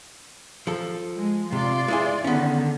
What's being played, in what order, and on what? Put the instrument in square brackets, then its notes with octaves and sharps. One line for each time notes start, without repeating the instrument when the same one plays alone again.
[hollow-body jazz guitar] F3 A4
[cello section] G#3
[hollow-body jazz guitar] C3 [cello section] F4 D5
[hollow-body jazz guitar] G#3 E4 G#5
[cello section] D3 D#3 [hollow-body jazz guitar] B3 C#4